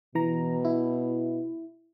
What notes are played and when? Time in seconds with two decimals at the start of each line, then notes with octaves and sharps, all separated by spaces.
0.15 B2 E3 A#5
0.65 E4